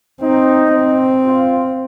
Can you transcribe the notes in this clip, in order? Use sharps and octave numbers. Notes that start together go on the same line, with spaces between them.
C4 D#4
C4
F4